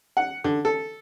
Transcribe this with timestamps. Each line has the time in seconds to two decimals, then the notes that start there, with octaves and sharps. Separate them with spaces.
0.17 F#5
0.44 D3
0.65 A4